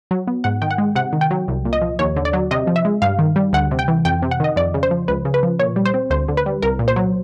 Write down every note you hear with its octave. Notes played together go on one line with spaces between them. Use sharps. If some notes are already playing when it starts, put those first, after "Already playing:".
F#3
B3
G#2 F#5
D#3 G5
F#5
G#3
C3 F#5
D#3
G5
F#3
C2
A#2
D#5
F3
D#2 C#5
D3
D5
F#3
C3 D#5
F3
E5
G#3
G2 F5
D#3
G3
D2 F#5
C3
G5
E3
F2 G5
C3
F#5
D#3 D#5
F2 D5
C#3
C5
F3
C#2 B4
C#3
B4
F3
A#2 C#5
G3
C5
C4
D2 C5
D3
B4
G3
C2 A#4
A#2
C5
F#3